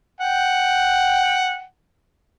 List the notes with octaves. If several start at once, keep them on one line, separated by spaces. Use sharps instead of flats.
F#5 G5